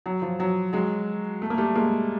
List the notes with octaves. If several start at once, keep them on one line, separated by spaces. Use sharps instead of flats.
F#3
F3
F#3
F#3 G#3
A3
A#3
G3 A3
G#3 A#3